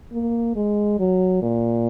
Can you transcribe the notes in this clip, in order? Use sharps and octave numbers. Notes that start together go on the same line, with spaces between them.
A#3
G#3
F#3
A#2